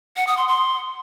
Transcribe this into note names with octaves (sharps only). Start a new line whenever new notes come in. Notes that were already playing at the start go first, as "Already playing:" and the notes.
F#5
D#6
C6
C6